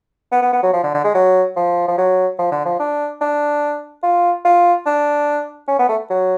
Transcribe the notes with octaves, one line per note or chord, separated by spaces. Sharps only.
B3
B3
B3
F#3
F3
D3
D3
G#3
F#3
F3
F3
F#3
F3
D3
F3
D4
D4
F4
F4
D4
C#4
B3
A3
F#3